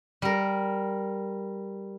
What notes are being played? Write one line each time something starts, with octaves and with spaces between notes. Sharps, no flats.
G3 A#4